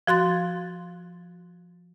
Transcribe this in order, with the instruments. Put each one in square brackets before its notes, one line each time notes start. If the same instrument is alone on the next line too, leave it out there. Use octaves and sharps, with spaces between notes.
[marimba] F3 F#4 C6 A6